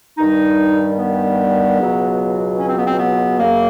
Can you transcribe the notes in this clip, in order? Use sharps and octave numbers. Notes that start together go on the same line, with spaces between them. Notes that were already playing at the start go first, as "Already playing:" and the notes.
G2 D#3 G3 D#4
B3
C#2 B2 F#3
C#4
C4
B3
C4
B3
F#2 C#3 F#3 A#3